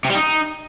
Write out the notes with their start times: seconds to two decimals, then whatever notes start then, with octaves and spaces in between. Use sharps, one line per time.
0.05 C3
0.10 G3
0.15 D#4